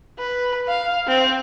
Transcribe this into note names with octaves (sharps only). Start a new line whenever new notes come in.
B4
F5
C4